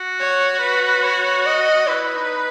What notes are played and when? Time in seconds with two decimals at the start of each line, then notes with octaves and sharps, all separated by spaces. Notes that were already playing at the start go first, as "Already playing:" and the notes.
Already playing: F#4
0.19 C#5
0.61 B4
1.03 C#5
1.46 D#5
1.87 E4 B4
2.15 D#4